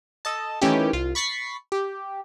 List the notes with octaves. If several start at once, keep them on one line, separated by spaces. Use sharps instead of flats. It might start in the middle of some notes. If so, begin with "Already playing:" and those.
A4 D#5 A5
D#3 E3 A3 C#4 E4 G4
C2 F4
B5 C#6 A6 B6 C7
G4